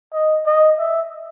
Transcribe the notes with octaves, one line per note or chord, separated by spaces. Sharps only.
D#5
D#5
E5